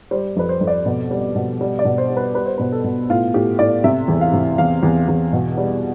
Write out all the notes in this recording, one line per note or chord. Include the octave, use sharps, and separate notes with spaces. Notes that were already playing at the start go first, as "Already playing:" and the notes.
G3 C5
F2 B4
C5
F2
D5
B2
G3
B2
G3
D5
B2
C5
G3
B4
G3 B4
C5
B2 B4
A4
B2
A2 F4
A2 G4
A2 D5
C3 E5
E2
F5
C3
E2 F5
E2
E2
B2
G3